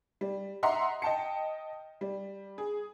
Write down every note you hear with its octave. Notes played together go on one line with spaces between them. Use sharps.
G3
D#5 E5 F#5 A#5 C6
D#5 G5 A5 C#7
G3
G#4